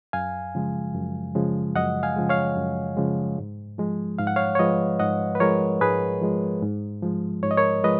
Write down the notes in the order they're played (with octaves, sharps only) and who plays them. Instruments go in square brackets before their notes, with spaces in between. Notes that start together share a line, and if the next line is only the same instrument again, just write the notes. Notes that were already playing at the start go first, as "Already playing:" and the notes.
[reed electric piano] F#2 F5 G#5
C#3 F3 G#3
F#2
C#3 F3 G#3
F#2 D#5 F#5
F5 G#5
C#3 F3 G#3
C#5 F5
F#2
C#3 F3 G#3
G#2
F3 G#3
G#2 F5
F#5
C#5 F5
C#5
F3 G#3 B4 D#5
G#2 D#5 F#5
B4
F3 G#3 A#4 C#5
G#2 G#4 B4
F3 G#3
G#2
F3 G#3
G#2 C#5
D#5
A#4 C#5
F3 G#3 B4 D#5